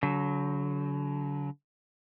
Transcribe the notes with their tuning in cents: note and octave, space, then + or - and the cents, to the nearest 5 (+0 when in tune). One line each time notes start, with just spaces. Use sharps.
D3 -45 F#3 +0